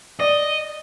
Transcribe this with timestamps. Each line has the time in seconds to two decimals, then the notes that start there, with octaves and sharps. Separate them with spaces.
0.20 D5 D#5